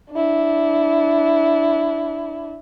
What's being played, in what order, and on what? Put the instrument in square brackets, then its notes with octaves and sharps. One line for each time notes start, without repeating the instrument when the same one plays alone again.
[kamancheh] D4 E4